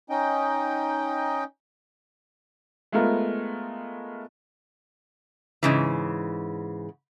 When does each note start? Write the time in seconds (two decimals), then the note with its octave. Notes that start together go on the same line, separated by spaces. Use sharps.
0.10 C#4 D#4 D#5 G5
2.92 G#3 A3 B3 F4 A#4
5.63 G#2 C#3 E3